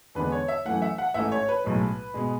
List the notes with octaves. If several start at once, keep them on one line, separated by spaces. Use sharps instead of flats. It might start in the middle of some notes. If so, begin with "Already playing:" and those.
E2 D3 G#3 B3 B4
C#5
E5
F#2 E3 A3 F#5
E5
F#5
A1 G#2 E3 A3 E5
C#5
B4
B1 A2 G#3
B2 G#3